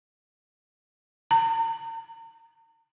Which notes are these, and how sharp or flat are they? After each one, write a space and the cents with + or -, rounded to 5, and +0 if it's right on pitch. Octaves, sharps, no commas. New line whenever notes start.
A#5 -40